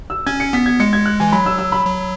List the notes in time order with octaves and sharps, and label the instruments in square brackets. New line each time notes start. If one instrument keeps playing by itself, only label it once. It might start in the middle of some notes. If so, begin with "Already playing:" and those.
[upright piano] E6
[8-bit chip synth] C#4 [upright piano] G#6
[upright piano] C#7
[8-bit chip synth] B3 [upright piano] B6
[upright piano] G#6
[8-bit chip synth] G#3 [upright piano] C#7
[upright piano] G#6
F#6
[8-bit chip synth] E3 [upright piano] G#5
[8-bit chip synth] F#3 [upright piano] B5
[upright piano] E6
E6
B5
[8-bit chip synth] F#3